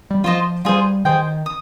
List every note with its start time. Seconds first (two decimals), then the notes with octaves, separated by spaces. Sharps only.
0.11 G3
0.24 F3 F4 C5 D#5
0.65 G3 F4 G#4 C5
1.05 D#3 G#4 C5 G5
1.46 D#6